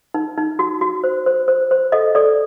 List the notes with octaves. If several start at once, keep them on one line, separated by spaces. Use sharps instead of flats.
D#4
D#4
F#4
F#4
C5
C5
C5
C5
A4 D#5
A4 D5